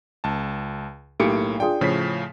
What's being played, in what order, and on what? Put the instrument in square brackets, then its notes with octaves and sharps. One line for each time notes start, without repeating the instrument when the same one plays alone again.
[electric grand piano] C#2 A5
[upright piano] B1 G4 D7 [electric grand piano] A2 A#3 C#7
[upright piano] D4 F4 G#4 [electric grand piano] G5
[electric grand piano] A2 C#3 F3 [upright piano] C#5 B6